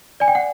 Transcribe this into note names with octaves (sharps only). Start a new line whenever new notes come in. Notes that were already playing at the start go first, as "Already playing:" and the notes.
D5 G#5
G5
F#5